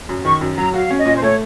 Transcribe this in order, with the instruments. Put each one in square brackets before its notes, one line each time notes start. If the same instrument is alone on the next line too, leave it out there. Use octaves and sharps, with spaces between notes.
[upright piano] F#2
[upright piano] D#3 [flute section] C#6
[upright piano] F#2
[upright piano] F#3 [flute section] A#5
[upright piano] F#4 [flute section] F5
[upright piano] C#4
[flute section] D#5
[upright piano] A#2
[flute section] C5
[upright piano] A3 [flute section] C#5